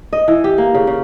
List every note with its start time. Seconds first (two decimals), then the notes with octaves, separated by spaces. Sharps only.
0.13 D#5
0.28 E3
0.44 G4
0.58 A#3
0.75 C#3
0.87 C#3